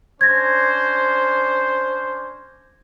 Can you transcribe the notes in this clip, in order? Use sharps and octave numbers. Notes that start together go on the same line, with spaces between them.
C#4 D4 C5 G#6 A#6